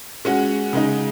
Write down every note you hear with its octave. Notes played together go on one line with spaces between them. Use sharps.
G#3 C#4 F#4
C#3 G#3 D#4